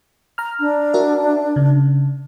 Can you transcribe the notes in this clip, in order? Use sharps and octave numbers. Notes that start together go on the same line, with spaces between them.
A#5 F6
D4
F#4 A#4 E5
C#3